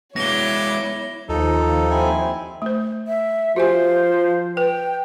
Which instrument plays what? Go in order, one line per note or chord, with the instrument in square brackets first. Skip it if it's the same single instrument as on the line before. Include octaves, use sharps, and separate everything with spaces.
[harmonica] F#3 D6 [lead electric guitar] G#3 B3 [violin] E4 C#5 [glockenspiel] A#6 G7
[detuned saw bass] D#2 [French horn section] F3 [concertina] D#4 A4
[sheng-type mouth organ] C4 E4 G#5
[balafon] A3 C5
[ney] E5
[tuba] F3 [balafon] F#4 G4 G#5 [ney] C5
[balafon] B4 [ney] G5